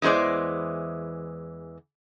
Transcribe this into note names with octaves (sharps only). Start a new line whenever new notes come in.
E2 E3 G#3 C5 D5